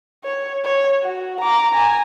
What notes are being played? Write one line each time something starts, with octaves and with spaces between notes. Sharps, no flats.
C#5
C#5
F#4
A#5 D6
G#5 A#5